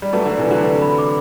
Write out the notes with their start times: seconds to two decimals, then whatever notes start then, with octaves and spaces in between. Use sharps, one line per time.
0.02 G3
0.13 F#3 A3 B4
0.26 D3 B4
0.38 C3 E3
0.47 D3 F#3 B4
0.64 B4
0.81 B5
0.98 D6